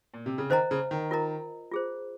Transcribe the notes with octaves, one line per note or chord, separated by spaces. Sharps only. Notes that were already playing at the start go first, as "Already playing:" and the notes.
A#2
C3
C#3
D#3 C5 D#5 A#5
C#3
D#3
F4 A#4 D#5 A#5
F4 G#4 C5